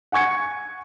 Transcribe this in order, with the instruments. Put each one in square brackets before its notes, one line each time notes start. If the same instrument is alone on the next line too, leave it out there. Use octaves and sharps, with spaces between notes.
[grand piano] F#5 G#5 C#6 G#6 C#7